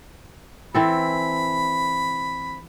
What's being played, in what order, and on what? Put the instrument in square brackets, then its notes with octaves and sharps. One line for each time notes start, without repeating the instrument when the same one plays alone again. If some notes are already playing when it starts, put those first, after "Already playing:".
[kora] E3 C4 A4 [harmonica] B5